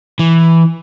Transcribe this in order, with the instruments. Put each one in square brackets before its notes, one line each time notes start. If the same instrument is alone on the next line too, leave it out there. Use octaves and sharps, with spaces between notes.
[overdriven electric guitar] E3